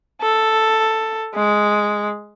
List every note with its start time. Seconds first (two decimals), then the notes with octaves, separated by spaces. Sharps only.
0.22 A4
1.35 G#3